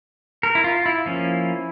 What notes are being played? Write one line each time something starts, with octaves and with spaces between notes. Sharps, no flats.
A#4
E4
F4
E4
F3 A#3 C#4